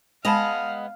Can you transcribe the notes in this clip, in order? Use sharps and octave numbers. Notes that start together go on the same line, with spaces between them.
G#3 B3 D#5 F5 A5 B5 F7